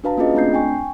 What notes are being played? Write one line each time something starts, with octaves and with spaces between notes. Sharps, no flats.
D4 F#4 B4 F5 A5 A#5
A#3 C#4 F4 G#4 D#5
A3 C4 D4 A#5 G6 C7
G5 G#5 C#6